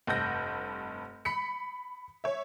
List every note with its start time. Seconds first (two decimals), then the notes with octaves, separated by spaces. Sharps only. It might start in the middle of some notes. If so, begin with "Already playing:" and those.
0.07 F1 G2 F#5 G6 A#6
1.25 B5 B6 C#7
2.24 C#5 E5